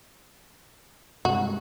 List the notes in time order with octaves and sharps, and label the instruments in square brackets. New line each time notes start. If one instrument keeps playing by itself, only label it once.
[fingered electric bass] G2 C3 G#3 [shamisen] F#4